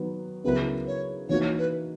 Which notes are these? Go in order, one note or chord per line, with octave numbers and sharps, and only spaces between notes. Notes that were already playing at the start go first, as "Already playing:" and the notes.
Already playing: D#3 F#3 B3
C#3 F#3 B3 E4 A#4 B4
C#5
E3 A#3 D#4 F#4 C#5
B4